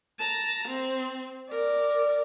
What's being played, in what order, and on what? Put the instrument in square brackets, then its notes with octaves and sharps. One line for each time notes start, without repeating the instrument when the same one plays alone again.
[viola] A5 A#5
C4
[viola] A#4 [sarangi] D5